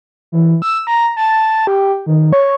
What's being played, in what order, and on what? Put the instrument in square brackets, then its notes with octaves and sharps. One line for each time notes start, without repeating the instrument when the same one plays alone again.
[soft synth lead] E3
E6
A#5
A5
G4
D#3
C#5